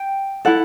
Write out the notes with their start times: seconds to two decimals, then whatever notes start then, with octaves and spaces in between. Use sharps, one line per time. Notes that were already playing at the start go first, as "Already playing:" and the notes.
Already playing: G5
0.45 E4 A4 F#5